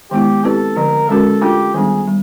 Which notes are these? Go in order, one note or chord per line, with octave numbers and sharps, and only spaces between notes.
D#3 G#3 B3 E4 G4
C4 E4 G4 A4 B4 D5
D3 F3 A3 A#4
G#3 C#4 F#4 A4 A#4
A3 D4 F4 G4 A4
D#3 G3 B3 D4 G#4
G3